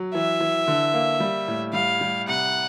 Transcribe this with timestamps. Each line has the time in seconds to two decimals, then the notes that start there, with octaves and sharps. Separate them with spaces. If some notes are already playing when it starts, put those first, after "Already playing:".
Already playing: F#3
0.15 E3 E5
0.40 E3
0.68 D3
0.94 A#3
1.20 G3
1.48 A2
1.73 G3 F5
2.01 G3
2.27 C2 F#5